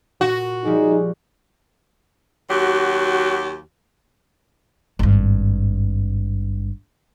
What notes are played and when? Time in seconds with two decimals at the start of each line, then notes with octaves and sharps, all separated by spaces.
0.21 A#2 F#4
0.65 F3 G3 G#3 D#4 G#4
2.50 D#2 F#3 F#4 G4
4.99 G#1 G2